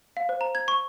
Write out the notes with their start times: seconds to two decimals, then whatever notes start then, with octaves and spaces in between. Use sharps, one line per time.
0.17 F5
0.29 C5
0.41 A#5
0.55 G#6
0.68 C#6